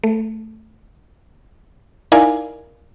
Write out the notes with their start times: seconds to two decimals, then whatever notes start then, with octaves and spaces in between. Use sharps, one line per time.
0.04 A3
2.12 D#4 E4 A#4 D5 F5 G#5